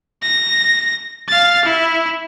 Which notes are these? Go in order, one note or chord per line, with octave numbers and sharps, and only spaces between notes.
A#6
F5 A6
E4